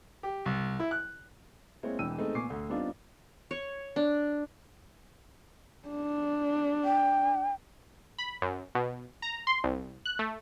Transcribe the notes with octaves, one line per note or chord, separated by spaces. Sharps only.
G4
C2
E4
F#6
G#3 A#3 C4 E4 C#5
E1 E3 D4 G5 E6 D#7
G#3 A3 B3 C4 D#4
A#2 B3 G#5 C#6 D6 C7
D2
G3 B3 C4 D4 D#4 F4
C#5
D4
D4
G5
B5
F#2
B2
A#5
C6
C2
F#6
A3